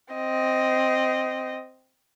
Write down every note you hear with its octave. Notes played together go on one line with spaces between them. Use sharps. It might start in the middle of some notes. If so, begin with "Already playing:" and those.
C4 D#5